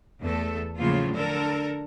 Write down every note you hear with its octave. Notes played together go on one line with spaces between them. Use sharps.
E2 A3 A4
A2 C#3 F3 F#3 A#3 F4
D3 A4 A#4